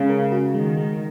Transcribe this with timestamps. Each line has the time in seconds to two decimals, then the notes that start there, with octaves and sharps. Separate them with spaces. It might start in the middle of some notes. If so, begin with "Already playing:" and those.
Already playing: C#3 G#3
0.09 A#4
0.32 F#4
0.54 D#3 G#3
0.77 G#3